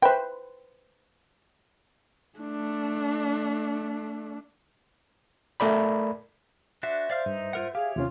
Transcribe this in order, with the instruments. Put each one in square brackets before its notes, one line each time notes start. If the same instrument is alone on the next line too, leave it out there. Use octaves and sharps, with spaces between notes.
[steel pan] B4 C5 [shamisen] E5 G5
[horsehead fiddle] A3 D4
[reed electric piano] A3 A#4 D5 B5
[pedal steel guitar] D4 F#4 C5 [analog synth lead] E5
[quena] C5 [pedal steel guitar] D5 F5 F6
[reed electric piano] G2 [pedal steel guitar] D#4
[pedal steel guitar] F4 A#4 F#5
[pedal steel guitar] G4 C#5 [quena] G#4 [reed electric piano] F5
[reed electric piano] D#2 C3 C#4 [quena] F4